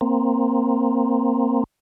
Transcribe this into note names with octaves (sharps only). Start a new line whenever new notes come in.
A#3 C4